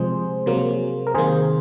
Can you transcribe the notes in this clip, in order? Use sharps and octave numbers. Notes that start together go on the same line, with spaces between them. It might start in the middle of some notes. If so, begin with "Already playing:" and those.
Already playing: C3 F3 G#3 G#4 C5
C3 F#3 A#3
A#4
C3 D#3 A#3 G#4 C5